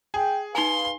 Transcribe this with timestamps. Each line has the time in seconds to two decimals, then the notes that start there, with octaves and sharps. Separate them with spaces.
0.14 G#4 G5
0.55 D#4 B4 F5 G#5 C6